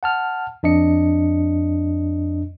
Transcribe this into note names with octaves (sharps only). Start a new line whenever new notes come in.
F#5 A5 F6
F2 D4 D#5 C#7